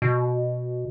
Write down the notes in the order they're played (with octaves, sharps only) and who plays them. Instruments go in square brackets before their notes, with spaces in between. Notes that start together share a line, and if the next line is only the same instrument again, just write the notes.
[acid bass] B2